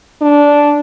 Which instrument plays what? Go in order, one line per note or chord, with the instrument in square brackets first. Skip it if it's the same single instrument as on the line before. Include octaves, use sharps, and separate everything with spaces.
[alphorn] D4